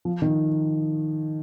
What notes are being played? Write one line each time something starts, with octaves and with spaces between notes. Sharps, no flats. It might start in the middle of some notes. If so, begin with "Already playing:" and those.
F3
D#3